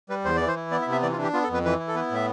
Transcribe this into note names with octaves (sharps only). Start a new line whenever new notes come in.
G3 B4
E2 C5
E3 D5
C5
E4
B3 D5
E5
C3
E5
E3 D5
F4
D4
G4
B3 F4
A4
F2
B4
E3 B4
E4
A4
B3 B4
A2 E5